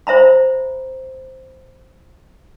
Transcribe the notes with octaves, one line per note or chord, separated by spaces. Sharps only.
C5 E5 A#5 B5